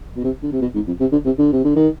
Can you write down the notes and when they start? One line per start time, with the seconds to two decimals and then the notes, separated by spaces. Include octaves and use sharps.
0.16 B2
0.24 C3
0.43 D3
0.52 C3
0.61 B2
0.74 G#2
0.87 F2
1.00 C3
1.12 D3
1.25 C3
1.38 D3
1.52 C3
1.64 D3
1.76 D#3